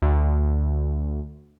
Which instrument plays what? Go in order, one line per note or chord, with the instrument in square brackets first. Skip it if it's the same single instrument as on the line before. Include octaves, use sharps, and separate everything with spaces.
[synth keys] D2